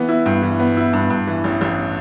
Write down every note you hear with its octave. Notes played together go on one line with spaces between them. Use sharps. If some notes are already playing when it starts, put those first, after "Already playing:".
Already playing: E3 B3
E4
G2
E3
B3
E4
G2
G2
E3
A1
A1